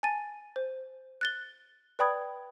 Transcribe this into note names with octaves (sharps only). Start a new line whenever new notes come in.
G#5 A5 A6 D#7
C5
F#6 A6 G7
B4 D5 G5 B5 D#6 G#6